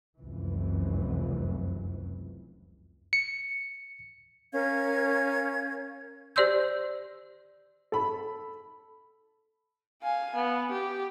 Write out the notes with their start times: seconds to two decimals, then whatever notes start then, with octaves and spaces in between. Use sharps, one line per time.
0.19 F1 C#2 F#2 E3
3.13 C#7
4.52 C#4 A#4 F5 G#6
6.36 G4 C5 D5 C6 E6 G6
7.92 A4 B5
10.02 F5 G#5
10.35 B3
10.71 G4